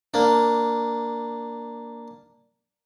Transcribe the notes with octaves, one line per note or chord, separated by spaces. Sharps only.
A#3 D4